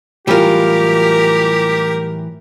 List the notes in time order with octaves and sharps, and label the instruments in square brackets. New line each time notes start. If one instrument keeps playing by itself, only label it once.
[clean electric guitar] A2 E3 F#3 [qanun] G3 F4 [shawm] G4 [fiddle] A#4